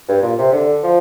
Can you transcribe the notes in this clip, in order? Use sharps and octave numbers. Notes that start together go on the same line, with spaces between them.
G2
A#2
C3
D3
F3